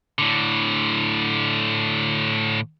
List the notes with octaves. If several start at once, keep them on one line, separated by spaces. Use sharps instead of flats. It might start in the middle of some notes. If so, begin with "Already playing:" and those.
A2 D3